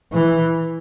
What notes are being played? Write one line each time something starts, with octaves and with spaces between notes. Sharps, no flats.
E3